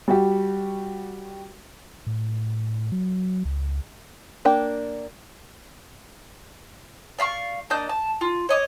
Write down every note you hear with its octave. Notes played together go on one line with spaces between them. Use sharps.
G3 F#4 G4
A2
F#3
C#2
A#3 D4 G5
D5 F5 B5 C#6
A#3 D4 D#5 G6
A5
F4
C#5 D#5 D6